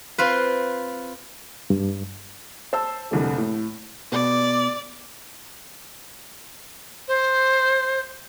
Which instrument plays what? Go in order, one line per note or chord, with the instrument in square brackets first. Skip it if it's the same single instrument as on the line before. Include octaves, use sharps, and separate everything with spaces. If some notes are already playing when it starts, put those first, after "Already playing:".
[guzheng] C4 F4 B4
[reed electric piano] G2
[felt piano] C5 A5 E6
F1 C2 D3
A2
[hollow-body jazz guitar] B2 [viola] D5
[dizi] C5